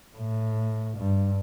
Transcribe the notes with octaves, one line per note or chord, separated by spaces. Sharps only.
A2
G2